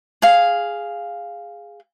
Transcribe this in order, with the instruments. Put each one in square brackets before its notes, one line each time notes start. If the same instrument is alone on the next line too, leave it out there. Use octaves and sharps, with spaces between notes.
[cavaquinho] G#4 F5